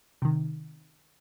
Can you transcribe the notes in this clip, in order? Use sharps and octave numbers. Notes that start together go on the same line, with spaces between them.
C3 D#3